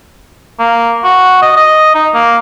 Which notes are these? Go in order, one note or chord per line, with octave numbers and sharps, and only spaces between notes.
A#3
F#4
D#5
D#5
D#4
A#3